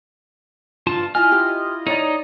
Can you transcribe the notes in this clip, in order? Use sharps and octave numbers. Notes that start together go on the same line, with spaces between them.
G2 F4 A5
E4 F4 D#5 G#5 F6
G4
D#4 C#5 D5